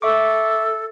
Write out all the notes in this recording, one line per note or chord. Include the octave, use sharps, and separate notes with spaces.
A4 E5 C#6 D6